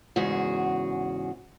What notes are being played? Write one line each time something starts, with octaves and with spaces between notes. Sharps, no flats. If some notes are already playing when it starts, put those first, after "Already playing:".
E2 G#2 C#3 F#4 G#4